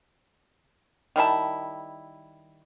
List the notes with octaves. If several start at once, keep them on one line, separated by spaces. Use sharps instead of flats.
D#3 G3 E4 A5